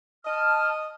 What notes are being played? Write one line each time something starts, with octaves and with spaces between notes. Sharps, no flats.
D#5 A5 F6